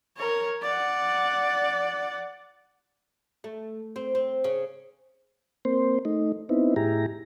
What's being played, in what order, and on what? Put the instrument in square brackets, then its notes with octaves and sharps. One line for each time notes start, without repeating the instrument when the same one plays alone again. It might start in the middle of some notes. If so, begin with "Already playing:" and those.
[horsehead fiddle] A#4 C#5
D5 F#5
[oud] A3
C4
C4
C#3
[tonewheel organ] A#3 C4 C5
A3 D#4
B3 C4 D#4 E4
A2 E4 G4 G#4 A#5